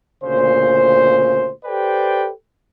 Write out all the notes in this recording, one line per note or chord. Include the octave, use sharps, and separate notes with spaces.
D2 A#2 C#3 C5
G4 A4 B4 C5 D5 G5